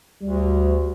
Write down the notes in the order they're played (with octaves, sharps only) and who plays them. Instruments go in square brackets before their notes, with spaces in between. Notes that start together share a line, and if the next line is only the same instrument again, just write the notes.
[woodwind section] D2 [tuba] G3